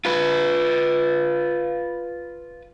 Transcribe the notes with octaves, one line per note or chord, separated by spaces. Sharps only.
F4 B4